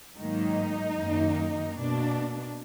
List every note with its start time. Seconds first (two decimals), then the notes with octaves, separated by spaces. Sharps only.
0.17 G#2 D#3 F#3 A#3 D#4
0.97 F#2 D#3 A#3
1.76 B2 A#3 D4